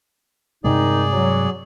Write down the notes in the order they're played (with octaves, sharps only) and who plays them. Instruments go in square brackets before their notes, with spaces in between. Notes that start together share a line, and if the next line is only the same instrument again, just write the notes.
[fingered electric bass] G2 C3 G#3 [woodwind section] D#3 D#4 [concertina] G#4 D5
[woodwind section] F#3